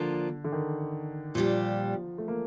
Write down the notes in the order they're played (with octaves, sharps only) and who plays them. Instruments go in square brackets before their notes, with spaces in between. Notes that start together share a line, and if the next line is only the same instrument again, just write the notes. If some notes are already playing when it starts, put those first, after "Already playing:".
Already playing: [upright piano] D3 [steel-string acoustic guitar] F3 A#3 D4 F4
[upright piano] D3
D#3
[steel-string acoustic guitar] A#2 G3 D4 G4 [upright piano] F3
[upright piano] A3
A#3